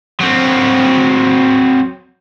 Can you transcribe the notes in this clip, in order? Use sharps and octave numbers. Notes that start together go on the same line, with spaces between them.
F#3 C4